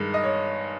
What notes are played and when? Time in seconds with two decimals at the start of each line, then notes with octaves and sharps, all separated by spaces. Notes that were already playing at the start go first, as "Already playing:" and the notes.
Already playing: G2 D#3 G#3
0.14 D#5
0.24 C#5